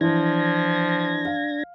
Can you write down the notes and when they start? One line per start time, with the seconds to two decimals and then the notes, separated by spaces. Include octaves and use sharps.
0.01 E3 F3 D4 G#6 A#6
1.25 F5